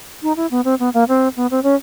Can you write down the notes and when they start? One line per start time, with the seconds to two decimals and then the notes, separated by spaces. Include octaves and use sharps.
0.23 D#4
0.37 E4
0.51 B3
0.65 C4
0.79 B3
0.94 A#3
1.08 C4
1.37 B3
1.51 C4
1.63 C#4